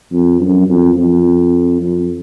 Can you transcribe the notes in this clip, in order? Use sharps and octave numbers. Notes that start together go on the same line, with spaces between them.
F2
F#2
F2
F2
F2